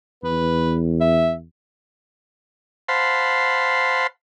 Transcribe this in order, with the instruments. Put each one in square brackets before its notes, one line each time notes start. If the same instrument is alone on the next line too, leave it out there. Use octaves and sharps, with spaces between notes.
[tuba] E2 [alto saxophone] B4
[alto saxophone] E5
[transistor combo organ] C5 F5 F#5 A5 B5 C6